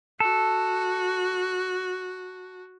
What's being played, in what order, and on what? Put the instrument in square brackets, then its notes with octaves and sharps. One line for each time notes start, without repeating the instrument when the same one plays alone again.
[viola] F#4 [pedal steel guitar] A4